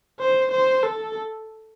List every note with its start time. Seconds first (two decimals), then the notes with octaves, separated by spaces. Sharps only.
0.20 C5
0.51 C5
0.83 A4